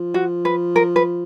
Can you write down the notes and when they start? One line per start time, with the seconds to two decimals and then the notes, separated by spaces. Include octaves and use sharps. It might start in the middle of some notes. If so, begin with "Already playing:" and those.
Already playing: F3
0.14 F#4
0.45 B4
0.76 A#4
0.96 B4